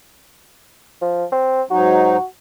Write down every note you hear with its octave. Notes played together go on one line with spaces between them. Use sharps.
F3
C4
G#2 F#3 D#4 F#4